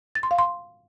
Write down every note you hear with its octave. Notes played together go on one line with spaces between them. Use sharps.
A6
C6
F5
C6